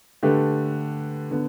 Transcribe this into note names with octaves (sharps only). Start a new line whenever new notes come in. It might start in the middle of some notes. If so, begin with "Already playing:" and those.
D3 A3 G4 B4
D3 B3